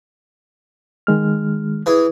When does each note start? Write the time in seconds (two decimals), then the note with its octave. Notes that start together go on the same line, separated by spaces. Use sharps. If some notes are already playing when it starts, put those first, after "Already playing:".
1.07 D#3 G#3 F6
1.86 E3 G#4